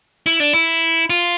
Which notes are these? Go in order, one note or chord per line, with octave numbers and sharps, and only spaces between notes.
E4
D4
E4
F4